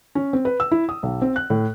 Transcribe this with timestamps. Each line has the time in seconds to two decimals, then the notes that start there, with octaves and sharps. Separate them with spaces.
0.15 C#4
0.33 C4
0.45 B4
0.60 E6
0.71 E4
0.89 D#6
1.03 B1
1.22 C4
1.36 F#6
1.50 A2